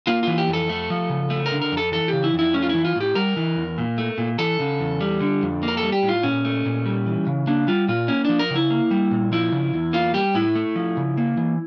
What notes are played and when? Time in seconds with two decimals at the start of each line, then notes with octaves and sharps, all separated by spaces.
0.07 A#3 F4
0.23 E3 F4
0.38 G4
0.48 F2
0.53 A4
0.69 A3
0.90 F3
1.10 C#3
1.30 A3
1.46 A#4
1.52 D3
1.62 A#4
1.72 F2
1.77 A4
1.92 E3 A4
2.08 C#3 G4
2.24 E4
2.34 F2
2.39 E4
2.54 A3 C#4
2.62 F4
2.69 E3 E4
2.85 F4
2.96 A2 G4
3.15 G3 A#4
3.36 E3
3.56 E2
3.78 A#2
3.98 A3
4.18 A#2
4.39 E3 A4
4.60 C#3
4.80 E2
5.01 G3
5.21 D3
5.42 F2
5.63 A#3
5.68 A#4
5.77 A4
5.83 G3
5.92 G4
6.03 A2
6.09 F4
6.23 A#2 C#4
6.45 A3
6.66 A#2
6.86 G3
7.06 E3
7.27 C#3
7.47 A#3 D4
7.68 G3 F4
7.88 A#2 F4
8.08 A#3 C#4
8.25 F3 D4
8.39 A#4
8.50 C#3
8.56 E4
8.70 A#3
8.91 G3
9.11 A#2
9.32 F3 E4
9.52 C#3
9.74 E2
9.93 A#3 F4
10.14 G3 G4
10.35 A2 E4
10.55 A3
10.76 F3
10.97 C#3
11.18 A#3
11.37 E3